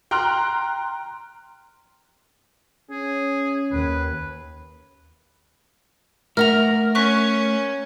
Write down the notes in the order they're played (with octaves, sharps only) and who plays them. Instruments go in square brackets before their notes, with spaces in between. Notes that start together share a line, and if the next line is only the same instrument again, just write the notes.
[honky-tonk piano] G5 A#5 C6 F6 F#6
[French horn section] C#4 [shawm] G#4
[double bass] D#2 [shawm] B4
[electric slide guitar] A3 E5 F#5 [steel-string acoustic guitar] A#4 [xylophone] F6 A#6 F7
[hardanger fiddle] C#4 [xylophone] C#6 F#6 B6